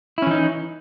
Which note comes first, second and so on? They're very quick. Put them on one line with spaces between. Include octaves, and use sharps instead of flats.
E4 C#4 E3 D#4